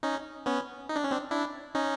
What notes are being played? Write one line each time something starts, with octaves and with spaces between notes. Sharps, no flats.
C#4 D#4
B3 C#4
D#4
D4
C#4
C4 D4
D4 E4
C#4 D#4